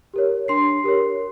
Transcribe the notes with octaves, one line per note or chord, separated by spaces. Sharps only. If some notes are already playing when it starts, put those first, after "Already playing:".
G4 A#4 C#5
D4 C6 C7
G4 A#4 C#5